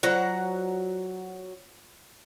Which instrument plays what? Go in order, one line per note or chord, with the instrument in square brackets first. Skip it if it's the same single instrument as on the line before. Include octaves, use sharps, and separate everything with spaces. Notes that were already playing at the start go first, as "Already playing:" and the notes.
[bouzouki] F#3 F#5 A#5 [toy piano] F4 C5 D5